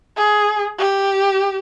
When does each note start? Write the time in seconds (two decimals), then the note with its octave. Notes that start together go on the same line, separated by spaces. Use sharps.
0.16 G#4
0.79 G4